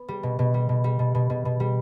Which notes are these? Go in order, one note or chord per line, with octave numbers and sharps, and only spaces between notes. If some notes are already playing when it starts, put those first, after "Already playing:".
Already playing: B3
G3
B2
B2
G3
B2
G3
B2
B2
B2
B2
G3